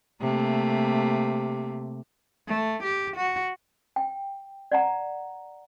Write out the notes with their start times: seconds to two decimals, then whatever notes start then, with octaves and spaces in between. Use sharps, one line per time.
0.21 C3 A3 A#3
2.48 A3
2.83 G4
3.16 F#4
3.96 G5
4.72 D5 F#5 A#5